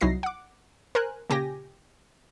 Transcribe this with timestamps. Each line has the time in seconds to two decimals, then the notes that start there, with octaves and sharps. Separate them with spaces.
0.01 C2 F#3 D#4 E4 A#6 C7
0.23 F#5 D6
0.95 A#4 C5 G#5 F#6
1.30 A#2 C#3 G4 G#5 A#6